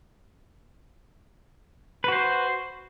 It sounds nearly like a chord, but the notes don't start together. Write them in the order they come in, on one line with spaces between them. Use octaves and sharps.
B4 F#4 C5